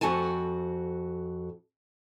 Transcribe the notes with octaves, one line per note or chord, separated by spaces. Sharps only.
F2 F#4 A4 G#5 A5